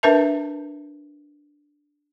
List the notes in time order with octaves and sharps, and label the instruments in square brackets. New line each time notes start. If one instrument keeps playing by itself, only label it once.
[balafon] D4 A#4 B4 E5 A5